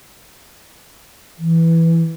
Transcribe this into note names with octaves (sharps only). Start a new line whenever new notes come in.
E3